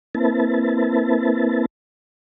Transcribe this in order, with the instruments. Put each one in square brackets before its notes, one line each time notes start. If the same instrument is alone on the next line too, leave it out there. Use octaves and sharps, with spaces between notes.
[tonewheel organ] A#3 C4 E4 B4 A5